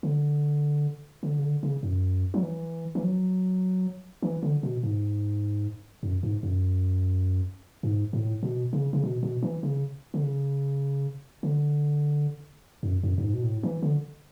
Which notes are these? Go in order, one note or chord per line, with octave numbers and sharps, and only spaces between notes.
D3
D3
C#3
D3
C#3
F#2
F#3
E3
E3
F#3
E3
D3
B2
G#2
F#2
G#2
F#2
G#2
A2
B2
C#3
C#3
B2
B2
E3
C#3
D3
C#3
D3
F#2
F#2
F#2
G#2
B2
A2
E3
D3